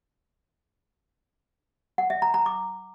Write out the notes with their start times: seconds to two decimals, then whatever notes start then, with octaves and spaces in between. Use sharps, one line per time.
1.98 F#5
2.10 E5
2.22 A#5
2.34 A#5
2.46 D6